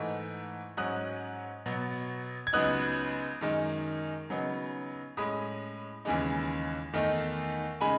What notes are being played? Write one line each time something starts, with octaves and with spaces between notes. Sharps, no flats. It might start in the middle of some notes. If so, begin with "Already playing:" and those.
Already playing: G#2 E3 A3 D#4
G#2 F#3 C#4 D#6 F#6
B2 F#3 B3
G#6
C#2 C#3 F#3 B3 D#4 D#6 F#6
F#2 D#3 G#3 D#4
C#3 F#3 B3 D#4
A2 G#3 C#4 B5 D#6
D#2 C#3 E3 G#3 D#4
E2 D#3 A3 D#4
C#3 G#3 D#4 G#5 B5